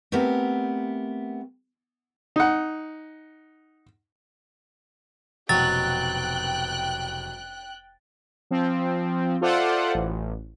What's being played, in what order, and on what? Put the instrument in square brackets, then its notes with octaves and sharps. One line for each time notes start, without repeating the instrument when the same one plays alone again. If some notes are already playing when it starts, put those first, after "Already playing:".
[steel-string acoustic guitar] A3 B3 C4 G4 A#4
[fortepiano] D#4 F#5
[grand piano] F1 B2 E3 [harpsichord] F#3 [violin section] G5 F#6 [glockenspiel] A6
[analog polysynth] F3 C4
F4 A4 C5 D5 E5 F#5
A1